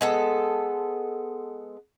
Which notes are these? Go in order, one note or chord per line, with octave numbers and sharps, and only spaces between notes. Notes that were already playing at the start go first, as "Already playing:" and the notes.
G#3 B3 A4